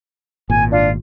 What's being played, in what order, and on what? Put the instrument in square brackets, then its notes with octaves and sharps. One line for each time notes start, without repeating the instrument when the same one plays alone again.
[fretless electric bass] G#1 A#2 [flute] G#5
[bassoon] D4 [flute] F4